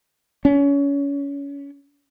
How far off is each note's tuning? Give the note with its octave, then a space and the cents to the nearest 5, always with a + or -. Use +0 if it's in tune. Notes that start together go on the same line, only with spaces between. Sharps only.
C#4 +25